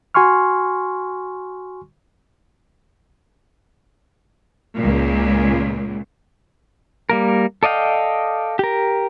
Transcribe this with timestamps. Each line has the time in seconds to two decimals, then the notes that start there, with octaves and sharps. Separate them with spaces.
0.14 F#4 G#5 C6 C#6 F6
4.76 C#2 A#2
7.10 G3 A#3 A#4
7.63 A4 D5 D#5 F5 G5
8.59 G4 A#4